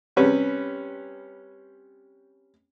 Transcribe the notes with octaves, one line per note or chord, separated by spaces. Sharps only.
C3 G3 C#4 B4